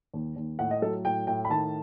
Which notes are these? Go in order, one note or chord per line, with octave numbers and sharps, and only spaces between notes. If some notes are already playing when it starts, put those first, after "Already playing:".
D#2
D#2
A2 F#5
D#5
F#3 A4
A2 G5
A2 G5
B5
D#3 A5